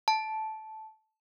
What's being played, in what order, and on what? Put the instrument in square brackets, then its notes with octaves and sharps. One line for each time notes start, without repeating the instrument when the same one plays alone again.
[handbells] A5